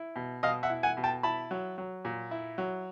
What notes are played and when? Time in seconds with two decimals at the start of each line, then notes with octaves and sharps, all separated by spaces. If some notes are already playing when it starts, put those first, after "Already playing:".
Already playing: E4
0.16 B2
0.43 B2 D#5 F5
0.63 E5 F#5
0.70 E4
0.83 F#5 G#5
0.97 B2
1.03 G5 A5
1.23 E4 A5 B5
1.51 F#3
1.78 F#3
2.05 A#2
2.31 E4
2.58 F#3